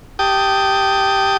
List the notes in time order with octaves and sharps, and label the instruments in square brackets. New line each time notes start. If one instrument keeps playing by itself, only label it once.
[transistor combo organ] G4 G5 A5 D#6